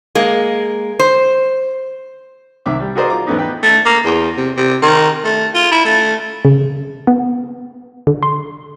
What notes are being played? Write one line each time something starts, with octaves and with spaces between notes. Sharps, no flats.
G#3 A#3
C5
C2 D#3 E5 D6
G3
F#4 G#4 A#4 C5 D5 D#5
F4 A#5 D6
E2 G#2 A3 B3 C#4 D#4
D#4 B4 G5
A3
A#3
E2
C3
C3
D#3
A3
F4
E4
A3
C#3
B3
D3
C6